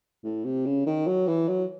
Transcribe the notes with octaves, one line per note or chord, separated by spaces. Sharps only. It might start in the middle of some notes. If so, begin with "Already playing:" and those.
A2
C3
C#3
D#3
F#3
E3
F#3